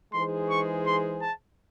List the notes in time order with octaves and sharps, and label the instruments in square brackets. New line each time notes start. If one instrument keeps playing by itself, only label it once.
[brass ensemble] E3 G#3 D#4 G#4 C5 [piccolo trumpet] C6
[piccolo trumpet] C#6
C6
A5